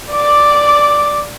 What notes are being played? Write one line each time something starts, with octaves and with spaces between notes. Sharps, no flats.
D5 D6